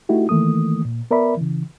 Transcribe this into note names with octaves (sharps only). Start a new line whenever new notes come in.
A3 D#4 E4 F#4 G4
D#3 E3 A3 A#3 D#6
A#2
B3 A#4 D5 E5 B5
C#3 E3